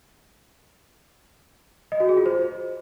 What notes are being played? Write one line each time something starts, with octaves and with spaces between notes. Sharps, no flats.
D#5
F#4
G#4
F4
C5